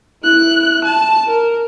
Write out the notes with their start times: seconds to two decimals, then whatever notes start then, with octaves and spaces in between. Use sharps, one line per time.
0.23 E4 F#6
0.84 A5
1.27 A#4